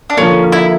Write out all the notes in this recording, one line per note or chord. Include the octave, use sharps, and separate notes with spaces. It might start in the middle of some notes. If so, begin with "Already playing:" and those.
D4
D3 F3 A#3 C#4
E4